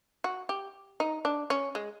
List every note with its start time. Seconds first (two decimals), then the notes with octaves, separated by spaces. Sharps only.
0.24 F#4
0.49 G4
1.00 D#4
1.25 D4
1.50 C#4
1.75 G#3